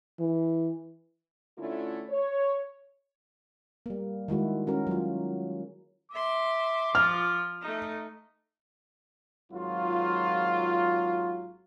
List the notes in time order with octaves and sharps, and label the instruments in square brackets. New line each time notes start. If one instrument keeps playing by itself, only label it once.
[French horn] E3
[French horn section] D3 A3 C#4 D4 E4 F4
C#5
[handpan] G3 A#3
D#3 G#3 E4 F#4
C#4 F#4 A#4
F#3 F4
[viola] E5 C6 [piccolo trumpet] D6
[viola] F3 F4 [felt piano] F6
[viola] A3 D#4
[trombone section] G#1 F#3 F4